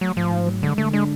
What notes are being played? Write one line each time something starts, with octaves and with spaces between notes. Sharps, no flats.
F#3 A3
G#2 F3
G#2
F#3
D3 G#3
D3 A3
G#3 D4